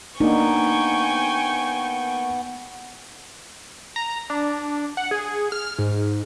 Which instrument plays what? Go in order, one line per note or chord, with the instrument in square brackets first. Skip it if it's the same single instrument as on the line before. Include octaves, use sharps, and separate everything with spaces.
[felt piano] A#3 D4 [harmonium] B3 [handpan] D#4 [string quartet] G5 G#5 C#6
[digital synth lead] A#5
D4
F#5
G#4
F6
G#2